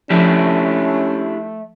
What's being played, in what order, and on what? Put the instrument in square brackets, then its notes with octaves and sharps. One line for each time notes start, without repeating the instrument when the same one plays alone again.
[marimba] F3 [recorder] A3 [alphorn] C#4 [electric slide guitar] D4 E4 G4